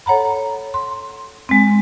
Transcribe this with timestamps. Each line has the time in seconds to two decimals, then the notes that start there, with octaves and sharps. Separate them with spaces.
0.06 A4 C#5 F#5 A#5 B5
0.74 C6
1.49 G#3 C4